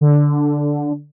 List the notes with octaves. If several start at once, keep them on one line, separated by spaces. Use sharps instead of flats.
D3